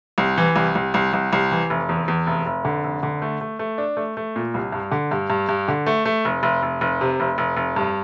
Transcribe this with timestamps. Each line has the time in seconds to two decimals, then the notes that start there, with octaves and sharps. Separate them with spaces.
0.18 C2
0.38 E3
0.56 C2
0.75 C2
0.94 C2
1.13 C2
1.33 C2
1.51 E3
1.70 F1
1.89 E2
2.08 E2
2.27 F1
2.46 F1
2.65 D3
2.84 F1
3.03 D3
3.22 A3
3.41 A3
3.59 A3
3.78 D4
3.97 A3
4.17 A3
4.36 A#2
4.54 C2
4.72 G2
4.92 D3
5.11 G2
5.30 G2
5.49 G2
5.68 D3
5.86 A3
6.05 A3
6.25 F1
6.43 F1
6.63 F1
6.81 F1
7.01 C3
7.20 F1
7.38 F1
7.57 F1
7.76 G2